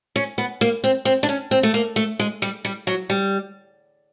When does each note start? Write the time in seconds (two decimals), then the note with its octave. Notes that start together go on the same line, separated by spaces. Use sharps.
0.16 C#4
0.38 B3
0.61 A#3
0.84 C4
1.05 C4
1.23 D4
1.29 C#4
1.51 C4
1.63 A3
1.74 A#3
1.96 A3
2.19 G#3
2.42 G3
2.65 G3
2.87 F#3
3.10 G3